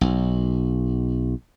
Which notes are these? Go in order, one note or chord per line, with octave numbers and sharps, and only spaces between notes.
B1